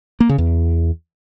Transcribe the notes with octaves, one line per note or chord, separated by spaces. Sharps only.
A#3
C#3
E2